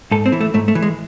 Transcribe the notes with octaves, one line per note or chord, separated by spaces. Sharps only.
G#2 A4
C4
E3
A3
G#2 A3
A3
E3
G#3